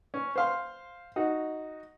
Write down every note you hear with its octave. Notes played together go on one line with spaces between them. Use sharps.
C#4
C5 F5 C6
D#4 F#4